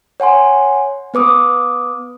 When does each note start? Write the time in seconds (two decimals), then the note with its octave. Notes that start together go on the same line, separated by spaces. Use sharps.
0.20 C#5 F#5 G#5 C6
1.14 B3 B4 D6 D#6